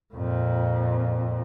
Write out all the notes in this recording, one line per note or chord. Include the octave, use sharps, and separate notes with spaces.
F2 A#2